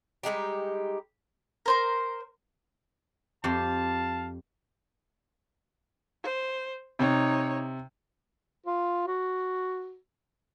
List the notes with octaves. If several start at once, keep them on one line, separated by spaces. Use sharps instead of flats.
G3 G#3 D#4 G4
A#4 C5 C6
F2 G4 C5 F5 A5
C5
C3 D#4 C#5
F4
F#4